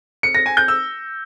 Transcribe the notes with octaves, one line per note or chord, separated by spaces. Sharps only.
C#7
A#6
G#5
G6
E6